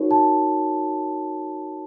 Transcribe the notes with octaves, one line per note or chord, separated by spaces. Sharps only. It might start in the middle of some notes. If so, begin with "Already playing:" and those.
Already playing: D#4 F#4 A#4 C#5
A5